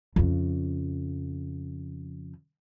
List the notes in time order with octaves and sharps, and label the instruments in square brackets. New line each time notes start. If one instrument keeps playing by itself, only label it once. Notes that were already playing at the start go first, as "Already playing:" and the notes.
[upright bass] F2 C#3